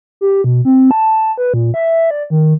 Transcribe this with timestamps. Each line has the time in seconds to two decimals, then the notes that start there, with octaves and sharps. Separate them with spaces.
0.21 G4
0.44 B2
0.65 C4
0.91 A5
1.38 B4
1.54 A#2
1.74 E5
2.11 D5
2.30 D#3